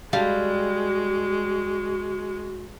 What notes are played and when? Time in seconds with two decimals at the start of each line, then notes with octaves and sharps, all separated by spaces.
0.13 G3 G#3 F#4 F5